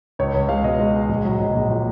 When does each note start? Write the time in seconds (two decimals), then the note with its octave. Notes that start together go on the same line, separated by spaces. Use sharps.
0.19 C#2 C#5
0.34 C#2
0.49 G#3 F5
0.64 B2 D#5
0.80 G#3
0.94 G#3
1.09 A#1
1.25 F#3
1.39 A#1
1.55 A#1
1.70 A#2